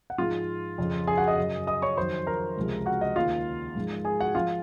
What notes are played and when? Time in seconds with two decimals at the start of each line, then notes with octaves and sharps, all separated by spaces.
0.10 F#5
0.18 G#2 F3 G#3 F4 F5
0.78 F2 C#3 F3
1.07 G#4 G#5
1.18 F#4 F#5
1.27 D#5 D#6
1.38 F#2 C#3 F#3
1.67 D#5 D#6
1.82 C#5 C#6
1.97 F2 D#3 F#3 C5 C6
2.27 A#4 A#5
2.57 C#2 C3 F3 G#3
2.86 F#4 F#5
3.01 D#5
3.16 D#2 C#3 G#3 F4 F5
3.76 G#2 F3 G#3
4.05 G#4 G#5
4.20 F#4 F#5
4.35 F3 G#3 F4 F5